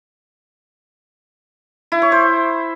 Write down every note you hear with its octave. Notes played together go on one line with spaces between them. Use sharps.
E4
C#5
C5